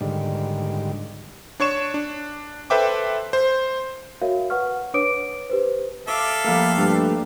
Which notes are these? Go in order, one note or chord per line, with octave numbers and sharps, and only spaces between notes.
G#2 D3 D#3 G3
D4 C#5 C#6 E7
D4
A4 B4 C5 E5 G5 D6
C5
F#4 A#4 C#5 E5 F5
B4 F#5 C#6 F6
D4 B4 C#5 D6 D#6 D7
G4 B4 C5
A4 E5 F5 D6
F3 G3 A3 A#3
G2 D4